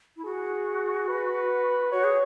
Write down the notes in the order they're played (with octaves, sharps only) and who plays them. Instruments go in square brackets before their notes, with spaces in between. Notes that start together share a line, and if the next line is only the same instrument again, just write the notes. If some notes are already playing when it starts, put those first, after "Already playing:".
[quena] E4
[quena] F#4 [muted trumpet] G#4
[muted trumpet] B4
[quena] F#4 [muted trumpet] C#5
[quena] G#4